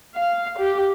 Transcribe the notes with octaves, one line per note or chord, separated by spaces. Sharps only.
F5
G4